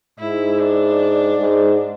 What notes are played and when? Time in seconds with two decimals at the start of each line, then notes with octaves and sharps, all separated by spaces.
0.19 G#2 E4
0.59 D4
1.38 G#2